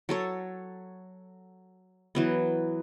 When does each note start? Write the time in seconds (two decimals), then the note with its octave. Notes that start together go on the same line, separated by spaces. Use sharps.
0.09 F#3 A4 C#5
2.15 E3 F#3 B3